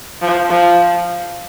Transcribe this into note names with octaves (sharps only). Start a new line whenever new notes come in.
F3
F3